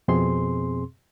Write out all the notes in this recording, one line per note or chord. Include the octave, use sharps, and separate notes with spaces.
F2 B2 C4 G#4 C6